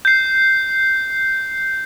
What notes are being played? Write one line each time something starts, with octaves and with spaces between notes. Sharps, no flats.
G6 C7